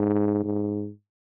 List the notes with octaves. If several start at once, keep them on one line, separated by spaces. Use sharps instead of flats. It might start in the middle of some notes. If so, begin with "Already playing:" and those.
Already playing: G#2
G#2